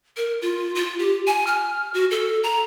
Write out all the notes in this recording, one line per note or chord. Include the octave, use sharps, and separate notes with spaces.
A#4
F4
F4
G4
G#5
F6
F#4
A4
A#5